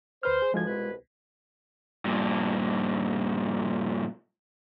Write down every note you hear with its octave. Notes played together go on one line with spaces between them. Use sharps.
D2 B4 C5 F6
G#4
D2 G#2 F3 G#3 F4 G#6
C2 B2 B4
G2 A#2